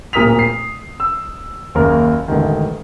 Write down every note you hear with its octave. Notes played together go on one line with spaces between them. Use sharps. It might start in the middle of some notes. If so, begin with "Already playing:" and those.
D1 A#2 A#4 D#6 B6 F7
C7
E6
F#1 D#2 C#3 A#4
E1 A1 D3 D#3